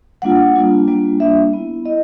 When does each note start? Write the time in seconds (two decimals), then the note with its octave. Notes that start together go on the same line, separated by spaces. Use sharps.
0.22 G3 A#3 D4 F4 F#5
0.56 G3 A#3 D4 F4
0.87 G3 A#3 D4 F4
1.20 G3 A#3 D4 F4 E5
1.53 B3 E4
1.85 E4 D#5